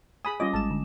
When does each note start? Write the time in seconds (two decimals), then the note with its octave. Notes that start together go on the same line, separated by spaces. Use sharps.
0.25 G#4 G#5 B5 D#6
0.40 G3 C#4 F4 D#5 D6
0.53 G#1 G#3 A5 E7
0.71 D3